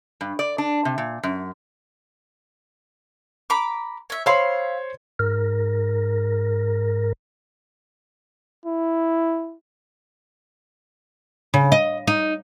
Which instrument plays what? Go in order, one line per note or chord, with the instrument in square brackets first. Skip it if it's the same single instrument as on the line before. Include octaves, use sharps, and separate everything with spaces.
[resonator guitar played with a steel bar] G2
D5
D4
C3
A#2
F#2
[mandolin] A#5 B5 D6
C#5 E5
[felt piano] C5 C#5 C6 [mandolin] F5 B5 E6
[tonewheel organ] G#2 A#4
[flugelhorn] E4
[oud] C#3
D#5
D#4